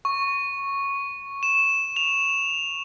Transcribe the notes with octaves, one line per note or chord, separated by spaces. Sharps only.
C#6
E7
F7